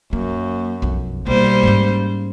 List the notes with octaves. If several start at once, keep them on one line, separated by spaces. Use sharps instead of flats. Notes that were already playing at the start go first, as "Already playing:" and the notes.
F#2 A#3
B1 F2
B1 G3 A#3 C5
G#2 C#4